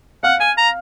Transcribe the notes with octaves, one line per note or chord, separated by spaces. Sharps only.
F5 F#5 F6
G#5
A#5